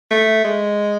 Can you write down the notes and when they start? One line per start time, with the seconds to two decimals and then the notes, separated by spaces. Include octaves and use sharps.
0.11 A3
0.45 G#3